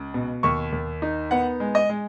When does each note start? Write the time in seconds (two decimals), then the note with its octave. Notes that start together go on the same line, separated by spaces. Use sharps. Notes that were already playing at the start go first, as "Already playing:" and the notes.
Already playing: C#2
0.14 B2
0.43 D#2 C#6
0.72 D#2
1.02 D#4
1.31 B3 F#5
1.60 G#3
1.75 D#5
1.89 G#3